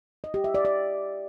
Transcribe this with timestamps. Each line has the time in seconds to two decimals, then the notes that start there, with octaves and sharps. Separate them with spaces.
0.24 D#5
0.34 G4
0.44 E5
0.55 D5
0.65 D5